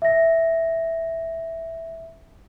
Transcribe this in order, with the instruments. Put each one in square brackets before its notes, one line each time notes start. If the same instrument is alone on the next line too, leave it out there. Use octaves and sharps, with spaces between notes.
[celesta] E5 A#6